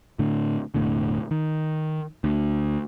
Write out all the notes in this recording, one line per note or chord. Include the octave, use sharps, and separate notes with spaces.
A2 D3
E1 A2 D3
D#3
D2